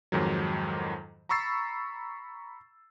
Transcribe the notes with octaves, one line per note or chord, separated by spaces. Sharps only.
F2 G#2 D#3 F#3
A#5 B5 C#6 E6 A6 C7